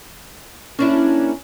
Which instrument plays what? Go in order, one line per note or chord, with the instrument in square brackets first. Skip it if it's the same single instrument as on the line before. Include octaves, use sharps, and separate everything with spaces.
[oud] A#3 D4 E4 [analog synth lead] C#4